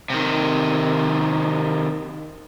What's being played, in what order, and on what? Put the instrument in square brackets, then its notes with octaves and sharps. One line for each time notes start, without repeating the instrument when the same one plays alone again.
[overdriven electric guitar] C3 D#3